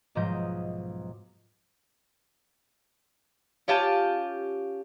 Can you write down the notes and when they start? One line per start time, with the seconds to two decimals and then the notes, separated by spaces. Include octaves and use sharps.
0.15 B1 G#2 F3 D#5 G6
3.68 C#4 F4 G4 A5